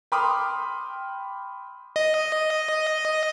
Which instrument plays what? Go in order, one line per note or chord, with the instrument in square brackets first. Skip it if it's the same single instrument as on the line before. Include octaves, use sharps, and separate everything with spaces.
[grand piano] G5 B5 C6 D6 D#6 F6
[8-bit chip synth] D#5